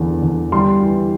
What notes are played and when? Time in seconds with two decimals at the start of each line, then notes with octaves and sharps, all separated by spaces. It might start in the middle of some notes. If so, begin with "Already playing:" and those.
Already playing: E2 D3
0.22 D3
0.52 G3 C6
0.81 E3